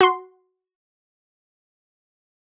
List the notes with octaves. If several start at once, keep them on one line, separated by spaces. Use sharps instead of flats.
F#4 C6